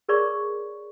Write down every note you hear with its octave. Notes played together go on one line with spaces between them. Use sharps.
G#4 A#4 C#5 D5 C#6